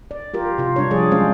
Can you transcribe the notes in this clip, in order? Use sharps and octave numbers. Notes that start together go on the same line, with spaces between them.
D5
F4 G4 A#4
C3 F4
G3 D4 C#5
F3 G3 D4 G#4 D5
F#3 G#3 C4 C#4 C5 F5